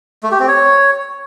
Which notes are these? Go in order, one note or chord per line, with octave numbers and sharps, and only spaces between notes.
A3
G4
C4
C#5